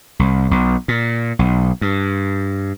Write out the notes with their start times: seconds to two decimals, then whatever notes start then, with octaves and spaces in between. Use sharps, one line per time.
0.19 C2
0.51 B1
0.88 A#2
1.39 B1
1.81 G2